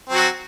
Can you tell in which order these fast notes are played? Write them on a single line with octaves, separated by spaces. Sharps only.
C4 F#3 F#4